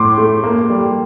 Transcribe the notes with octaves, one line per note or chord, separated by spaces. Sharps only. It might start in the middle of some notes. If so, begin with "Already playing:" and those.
Already playing: A2 C6 D6
A3
A#3
G3